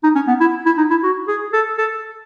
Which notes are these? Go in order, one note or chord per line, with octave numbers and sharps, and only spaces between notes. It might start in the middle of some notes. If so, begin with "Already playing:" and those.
D#4
C#4
B3
E4
E4
D#4
E4
F#4
G#4
A4
A4